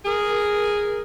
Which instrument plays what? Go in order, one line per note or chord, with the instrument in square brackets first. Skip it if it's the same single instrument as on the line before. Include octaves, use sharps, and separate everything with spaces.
[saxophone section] G#4 A#4